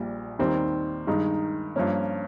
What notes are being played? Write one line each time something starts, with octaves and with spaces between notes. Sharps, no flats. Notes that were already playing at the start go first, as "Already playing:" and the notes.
Already playing: A#1 A#2 G3
D#2 D#3 G3 C4
G2 D#3 G#3 D#4
G2 F3 A#3 C#4